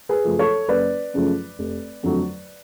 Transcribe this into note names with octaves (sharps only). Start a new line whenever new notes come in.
G#4 B4
F#2 C#3 F3 A3
A4 C#5
F#1 B4 D5
F#2 C#3 F3 A3
F1
F2 D3 F#3 A3